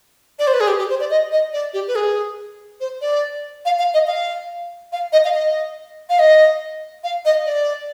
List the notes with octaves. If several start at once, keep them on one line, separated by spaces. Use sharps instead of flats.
D5
C5
B4
G#4
G4
G4
C5
D5
D#5
D#5
D5
G4
B4
G#4
C5
D5
F5
F5
D#5
F5
F5
D#5
F5
D#5
F5
D#5
F5
D#5
D5